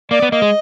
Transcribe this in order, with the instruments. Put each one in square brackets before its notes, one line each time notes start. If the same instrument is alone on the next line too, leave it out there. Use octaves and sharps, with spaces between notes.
[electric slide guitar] A#3 [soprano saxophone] D5
[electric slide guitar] B3
[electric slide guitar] A#3 [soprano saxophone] D#5
[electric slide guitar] G#3